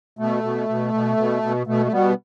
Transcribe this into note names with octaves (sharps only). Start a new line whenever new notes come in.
B2 A3
B2
B2
B2
B2
B2
B2 A3
A3
B2 G3 B3